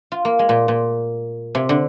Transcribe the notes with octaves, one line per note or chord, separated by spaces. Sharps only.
F4
A#3
G#3
A#2
A#2
C3
D3